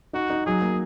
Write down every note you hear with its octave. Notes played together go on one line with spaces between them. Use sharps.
D#4 F#4
D#4
F#3 G#4
A#3